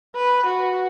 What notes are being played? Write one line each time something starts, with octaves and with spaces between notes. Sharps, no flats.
B4
F#4